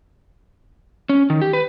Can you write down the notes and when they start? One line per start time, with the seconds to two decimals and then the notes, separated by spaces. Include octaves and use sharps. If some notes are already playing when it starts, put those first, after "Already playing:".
1.09 C#4
1.30 D#3
1.41 G4
1.53 B4